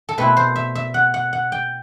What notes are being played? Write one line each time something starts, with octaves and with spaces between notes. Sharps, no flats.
A4
B2 A3 C4 E4 B4
C5
E5
E5
F#5
F#5
F#5
G5